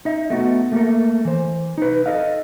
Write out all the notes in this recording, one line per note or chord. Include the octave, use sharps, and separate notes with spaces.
D#4 D#5 E5
A3 B3 F#4
A3 A#3 A4 A#4
E3 C5
D#4 B4
A4 D#5 F5